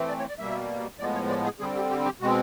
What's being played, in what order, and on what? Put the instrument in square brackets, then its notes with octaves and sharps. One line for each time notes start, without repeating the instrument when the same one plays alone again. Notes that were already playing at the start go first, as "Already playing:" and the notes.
Already playing: [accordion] E3 A3 C4
D5
C#5
D5
B2 G3 A#3 E5
A2 F3 G#3 B3 D5
C#5
D5
G#4
D3 G3 C4 G#4
G4
G4
G4
B2 G#3 C4 F#4